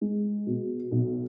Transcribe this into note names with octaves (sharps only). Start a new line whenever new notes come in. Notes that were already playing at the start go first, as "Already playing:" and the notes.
G#3
B2
B1